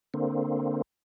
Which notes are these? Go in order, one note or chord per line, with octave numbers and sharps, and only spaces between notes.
D3 A#3 C4